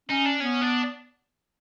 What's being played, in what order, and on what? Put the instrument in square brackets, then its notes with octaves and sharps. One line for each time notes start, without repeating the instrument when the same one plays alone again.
[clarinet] C#4 [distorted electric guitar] D#4
[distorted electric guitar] D4
[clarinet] B3 [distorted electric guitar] C#4
[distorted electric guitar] D4